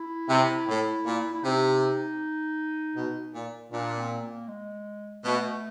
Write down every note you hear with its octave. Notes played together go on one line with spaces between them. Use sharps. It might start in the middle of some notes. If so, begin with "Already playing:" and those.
Already playing: E4
C3
A2
A#2
E4
C3 D#4
B2
A#2
A#2 D4
C4
A#3
G#3
B2 A3